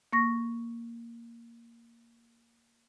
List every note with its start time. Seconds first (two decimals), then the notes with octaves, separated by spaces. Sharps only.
0.13 A#3 C#6 A#6